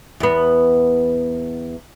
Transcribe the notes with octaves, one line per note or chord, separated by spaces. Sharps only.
E2 B3